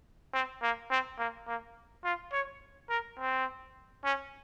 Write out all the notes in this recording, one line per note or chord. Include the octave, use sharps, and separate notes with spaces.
C4
A#3
C4
A#3
A#3
F4
C#5
A#4
C4
C#4